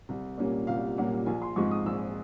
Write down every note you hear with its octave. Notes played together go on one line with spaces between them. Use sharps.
C2
A#2 G3 A#3 C#4
C2 F5
A#2 G3 A#3 C#4 F#5
A#1 G#5
C6
G#2 F3 G#3 C4 C#6
D#6
A#1 E6